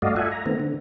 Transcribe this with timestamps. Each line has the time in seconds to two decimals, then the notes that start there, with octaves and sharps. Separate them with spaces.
0.02 G2 A3 F#4 D5 D#5 F5
0.16 F4 A4 E5 F#5 G#5
0.32 A#5
0.46 D#3 A3 B3 C4
0.60 D3